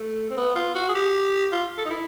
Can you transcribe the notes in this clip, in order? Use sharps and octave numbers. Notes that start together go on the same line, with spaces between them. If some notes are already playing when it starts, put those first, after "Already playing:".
Already playing: A3
C4
B3
F4
F#4
G#4
G4
F4
A4
D#4
E4